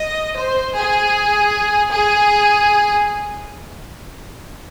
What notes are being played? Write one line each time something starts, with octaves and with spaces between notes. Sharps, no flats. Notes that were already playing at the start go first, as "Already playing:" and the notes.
Already playing: D#5
C5
G#4
G#4